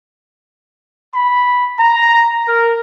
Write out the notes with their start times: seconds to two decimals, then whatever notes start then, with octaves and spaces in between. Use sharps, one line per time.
1.14 B5
1.80 A#5
2.48 A#4